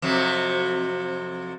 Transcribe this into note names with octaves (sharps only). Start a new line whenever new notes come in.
F2 C3 F#3